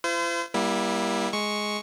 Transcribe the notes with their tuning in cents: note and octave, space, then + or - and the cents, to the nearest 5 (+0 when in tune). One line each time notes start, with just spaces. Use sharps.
F4 -45 C5 -35
G3 +0 A#3 +35 E4 +0
G#3 +10 C#6 +0